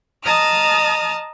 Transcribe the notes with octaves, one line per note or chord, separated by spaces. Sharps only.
D#5 A5 A#5 D#6 F6